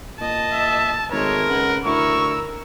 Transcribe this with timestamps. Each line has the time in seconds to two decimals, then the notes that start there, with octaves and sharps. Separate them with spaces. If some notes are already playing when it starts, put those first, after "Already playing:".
0.21 A#2 D#5 A5
0.52 E5
1.12 G#1 G#3 A3 A#4 C#5
1.50 C#3 B4 F#5
1.85 D2 E4 A#4 C#6 E6